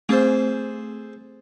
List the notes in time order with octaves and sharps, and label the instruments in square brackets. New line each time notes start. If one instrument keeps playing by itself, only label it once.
[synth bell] A3 C4 [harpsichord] G#4 A4 C5